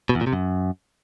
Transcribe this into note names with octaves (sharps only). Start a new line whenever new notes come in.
B2
E2
A#2
C3
F#2